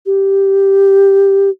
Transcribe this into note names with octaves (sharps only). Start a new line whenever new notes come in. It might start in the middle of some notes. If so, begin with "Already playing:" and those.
G4